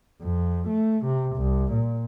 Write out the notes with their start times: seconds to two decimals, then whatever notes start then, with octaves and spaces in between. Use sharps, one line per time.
0.22 F2
0.69 A3
1.05 C3
1.37 C2
1.73 A#2